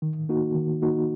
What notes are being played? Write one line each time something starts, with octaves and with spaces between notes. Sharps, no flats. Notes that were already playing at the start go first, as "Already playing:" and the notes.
D#3
A#3 D#4 F#4
D#3
A#3 D#4 F#4